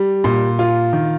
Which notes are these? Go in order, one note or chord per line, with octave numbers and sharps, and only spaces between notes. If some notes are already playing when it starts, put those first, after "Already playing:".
Already playing: G3
A#2
F4
D#3